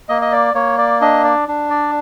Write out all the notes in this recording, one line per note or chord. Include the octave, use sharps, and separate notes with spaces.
A#3 D#5
D#5
D5
A#3 C#5
D5
D4 D#5
D5
D4
D5